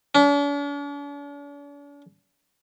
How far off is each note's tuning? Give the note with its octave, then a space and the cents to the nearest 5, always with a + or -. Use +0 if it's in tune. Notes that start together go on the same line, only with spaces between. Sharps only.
D4 -45